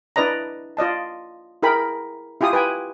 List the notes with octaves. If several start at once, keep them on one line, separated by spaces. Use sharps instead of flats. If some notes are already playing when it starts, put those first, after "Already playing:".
D4 E4 B4 D5 D#5 A#5
F4 D5 D#5 A5
E4 G#4 A#4 G5 B5
E4 F4 G4 G#5 D#6
B4 G5 G#5 D#6